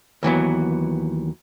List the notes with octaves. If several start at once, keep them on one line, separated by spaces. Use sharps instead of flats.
D#2 E3 F#3 B3